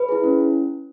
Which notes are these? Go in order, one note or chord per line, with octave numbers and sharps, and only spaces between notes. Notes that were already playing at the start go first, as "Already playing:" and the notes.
Already playing: B4
E4 G#4
C#4